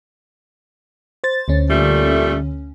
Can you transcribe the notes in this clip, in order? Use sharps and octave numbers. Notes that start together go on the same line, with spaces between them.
C5 A6
D2 D3 C#4
A#2 G3 A3